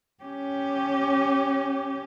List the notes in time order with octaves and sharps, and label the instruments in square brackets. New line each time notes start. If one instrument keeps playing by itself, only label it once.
[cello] C#4 G4